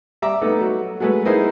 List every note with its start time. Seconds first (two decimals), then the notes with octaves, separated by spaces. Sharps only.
0.22 G3 E5 A#5 D6
0.42 A3 B3 D#4 A4
0.61 F#3
1.00 F#3 G#3 A3 G#4 B4
1.25 B3 D#4 E4 G#4 A#4 C5